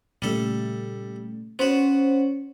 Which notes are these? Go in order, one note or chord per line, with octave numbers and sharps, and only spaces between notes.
A#2 C#3 G3 A3 A4
B3 C#4 F#4 C5 C#5